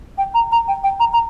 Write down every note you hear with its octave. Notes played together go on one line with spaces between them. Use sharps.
G5
A#5
A#5
G5
G5
A#5
A#5